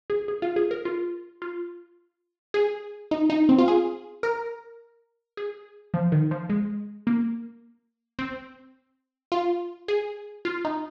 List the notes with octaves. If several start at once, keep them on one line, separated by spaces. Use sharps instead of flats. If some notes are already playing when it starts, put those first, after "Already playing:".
G#4
G#4
F4
G#4
A#4
F4
F4
G#4
D#4
D#4
C4
F4
G#4
A#4
G#4
F3
D#3
F3
G#3
A#3
C4
F4
G#4
F4
D#4